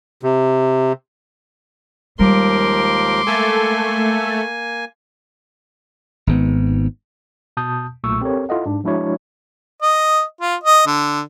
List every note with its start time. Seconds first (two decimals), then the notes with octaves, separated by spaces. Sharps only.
0.23 C3
2.19 D#2 F3 G3 G#3 A#4 C6 D6
3.27 A3 A#3 A4 G#5
6.27 G#1 G#2 B3
7.57 B2 A5 D#6 G6
8.04 B1 A#2 A3 C#6 E6
8.21 C4 G4 A4 A#4 C#5
8.49 E4 F4 A4 D#5 F#5
8.66 G#2 D4
8.84 F3 G#3 D4 E4 F#4 C#5
9.82 D#5
10.41 F4
10.64 D#5
10.86 D3